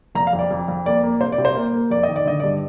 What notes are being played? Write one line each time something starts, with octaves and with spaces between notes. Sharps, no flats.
F1 A#5
F5
F2
D5
F2
F2
A#3 D5
A#3
C3 C5
D5
C3
C5
A#3
A#3
F2 D5
D#5
D#3
D5
D3 D#5
D5
G2